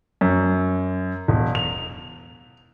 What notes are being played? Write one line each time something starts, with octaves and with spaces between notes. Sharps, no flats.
F#2
E1
F7